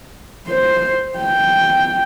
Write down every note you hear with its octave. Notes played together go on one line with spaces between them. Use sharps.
C5
G5